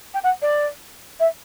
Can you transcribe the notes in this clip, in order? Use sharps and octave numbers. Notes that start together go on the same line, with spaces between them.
G5
F#5
D5
E5